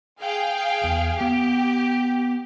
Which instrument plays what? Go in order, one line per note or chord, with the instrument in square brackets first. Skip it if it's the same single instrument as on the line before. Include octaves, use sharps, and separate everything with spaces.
[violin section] G#4 F5 G5
[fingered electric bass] E2
[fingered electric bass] B3 [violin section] G4